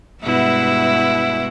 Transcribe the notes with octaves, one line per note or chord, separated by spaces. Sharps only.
G2 B2 G#3 E4 E5 F#5